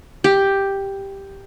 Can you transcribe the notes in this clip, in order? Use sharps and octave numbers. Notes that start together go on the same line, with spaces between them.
G4